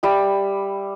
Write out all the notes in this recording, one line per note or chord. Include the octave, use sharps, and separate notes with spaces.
G3 E5 B5